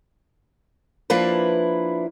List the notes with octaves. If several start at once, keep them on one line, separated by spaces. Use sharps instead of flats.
F3 A#3 D4 E4 B4